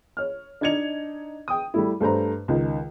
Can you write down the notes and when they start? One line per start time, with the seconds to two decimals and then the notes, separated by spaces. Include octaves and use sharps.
0.17 C#5 F6
0.61 D4 D#4 D#5 G#6 C#7 F7
1.48 G5 D#6
1.74 G3 A3 E4
2.01 G2 A3 C5 A#5
2.48 C#2 D#3